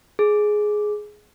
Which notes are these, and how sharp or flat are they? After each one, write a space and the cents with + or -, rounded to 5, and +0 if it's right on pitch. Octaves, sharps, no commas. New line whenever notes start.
G#4 +10